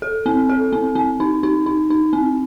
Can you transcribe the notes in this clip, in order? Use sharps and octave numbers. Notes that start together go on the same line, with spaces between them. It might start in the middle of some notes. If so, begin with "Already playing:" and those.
A4
C4
A4
C4
C4
D#4
D#4
D#4
D#4
C4